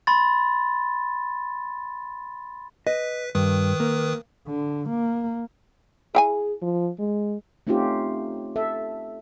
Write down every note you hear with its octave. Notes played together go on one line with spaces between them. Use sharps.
B5 C6 A6
B4 D#5 B6
G2 D#3 B4 D#6
A#3
D3
A#3
E4 G#4 G5 G#5
F3
G#3
A3 C4 C#4 D#4 F4 G4
A4 E5